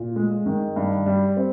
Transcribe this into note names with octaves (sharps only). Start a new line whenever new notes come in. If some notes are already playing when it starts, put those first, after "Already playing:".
Already playing: A#2
G#3
D#3
G2
G3
C4